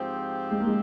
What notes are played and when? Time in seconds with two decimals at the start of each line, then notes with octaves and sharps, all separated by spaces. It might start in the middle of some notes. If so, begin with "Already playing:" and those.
Already playing: G#2 F3 C4 G4
0.51 G#3
0.60 A#3
0.67 G#3